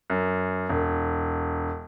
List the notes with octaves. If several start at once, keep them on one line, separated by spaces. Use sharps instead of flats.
F#2
E1